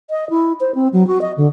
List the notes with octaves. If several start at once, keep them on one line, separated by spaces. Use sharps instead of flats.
D#5
E4
C5
C4
F#3
F#4
D#5
D3